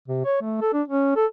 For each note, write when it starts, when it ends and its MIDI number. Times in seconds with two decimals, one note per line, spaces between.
0.08 0.21 48
0.25 0.38 73
0.42 0.60 57
0.61 0.69 69
0.73 0.82 62
0.88 1.16 61
1.16 1.26 69